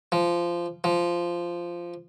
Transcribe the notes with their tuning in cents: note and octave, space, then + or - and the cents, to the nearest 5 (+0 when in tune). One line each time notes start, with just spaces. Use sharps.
F3 -15
F3 -10